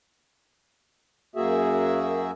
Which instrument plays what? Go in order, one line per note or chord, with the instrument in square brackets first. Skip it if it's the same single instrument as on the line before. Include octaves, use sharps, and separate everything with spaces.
[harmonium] F#2 A#3 F#4 G#4 E5